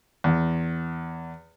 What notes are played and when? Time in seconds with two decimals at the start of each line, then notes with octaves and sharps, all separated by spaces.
0.24 E2